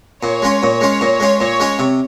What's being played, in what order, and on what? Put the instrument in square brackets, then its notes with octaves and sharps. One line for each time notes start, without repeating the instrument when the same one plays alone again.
[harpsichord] A#2 [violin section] C#5
[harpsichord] G#3 C#4 F4
A#2
G#3 C#4 F4
A#2
G#3 C#4 F4
[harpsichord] A#2 [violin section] C#5
[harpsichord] G#3 C#4 F4
C3